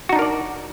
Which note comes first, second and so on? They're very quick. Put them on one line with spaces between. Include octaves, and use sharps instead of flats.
F#4 D#4 D4 A#4 D5